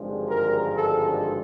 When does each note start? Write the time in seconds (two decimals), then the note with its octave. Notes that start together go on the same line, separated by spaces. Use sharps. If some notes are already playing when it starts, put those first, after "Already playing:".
Already playing: G#1 G2 D3 F3 G#3
0.26 A#4
0.73 A4